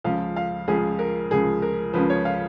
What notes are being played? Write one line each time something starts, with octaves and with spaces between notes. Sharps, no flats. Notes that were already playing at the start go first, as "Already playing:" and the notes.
C#2 C#3 F3 F5
F5
C#2 C#3 F3 G#4
A#4
C#2 C#3 F3 G#4
A#4
C#2 C#3 F3 B4
C#5
F5